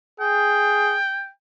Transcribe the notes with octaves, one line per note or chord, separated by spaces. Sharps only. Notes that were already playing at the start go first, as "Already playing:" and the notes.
G#4 G5